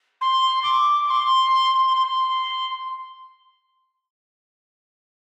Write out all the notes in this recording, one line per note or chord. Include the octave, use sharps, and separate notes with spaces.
C6
D6
D6
C6
C6